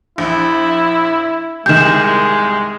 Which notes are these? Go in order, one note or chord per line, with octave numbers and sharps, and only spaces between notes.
A#1 E4
C2 D#3 G#3 G6 E7